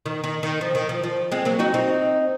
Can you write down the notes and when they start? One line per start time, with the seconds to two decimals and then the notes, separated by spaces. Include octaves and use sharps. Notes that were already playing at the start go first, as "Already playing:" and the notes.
0.06 D#3
0.24 D#3
0.43 D#3
0.61 F3
0.75 D#3
0.89 F3
1.04 F3
1.32 G#3 C4
1.45 F#3 A#3
1.59 D#4 F#4
1.74 C4 D#4